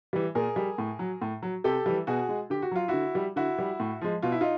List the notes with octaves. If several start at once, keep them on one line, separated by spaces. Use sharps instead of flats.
E3 G3
A#2 G#4 A#4
G3
A2
F#3
A2
F#3
C3 G4 A4
E3 G3
B2 F#4 G#4
G#3
D3 G4
F#4
F#3 F4
D3 E4 F#4
G3
D3 E4 F#4
G3
A2
F3 G#3
B2 F4
E4
D#4 F4